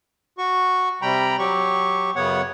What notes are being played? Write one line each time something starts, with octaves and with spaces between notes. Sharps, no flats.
F#4 C#6
C3 G3 G5 A#5 B5
F#3 G4 C#6
F#2 C#3 B3 C#5 F#5